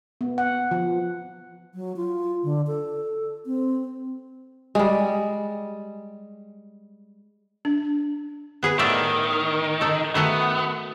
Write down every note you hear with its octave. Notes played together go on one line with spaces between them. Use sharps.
B3
F#5
F3
F#3
F4
D3
A4
C4
G3 G#3
D4
B3 G#4 B4
A2 D#3 D5 E5
D#4 A4
D#3 A3 B3 F#4